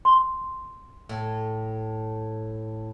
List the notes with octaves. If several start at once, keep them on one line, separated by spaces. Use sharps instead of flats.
C6
A2